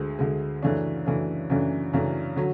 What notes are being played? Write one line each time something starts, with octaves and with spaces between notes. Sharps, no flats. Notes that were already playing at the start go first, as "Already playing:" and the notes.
Already playing: D2 D3 G#3
D2 D3 G#3
F#2 C#3 E3 A3 D4
F#2 C#3 E3 A3 D4
F#2 C#3 E3 A3 D4
F#2 C#3 E3 A3 D4
D3 F#3